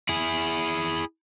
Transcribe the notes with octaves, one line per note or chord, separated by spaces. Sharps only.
E4 G#4